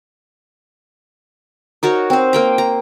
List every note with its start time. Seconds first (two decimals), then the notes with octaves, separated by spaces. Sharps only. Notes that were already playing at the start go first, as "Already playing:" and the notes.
1.83 D#4 F#4 A#4 C#5
2.10 C4 C5
2.33 A#3 G5 A#5
2.58 A#5